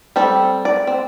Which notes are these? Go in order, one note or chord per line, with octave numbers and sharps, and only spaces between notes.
G3 C4 A4
D5
C4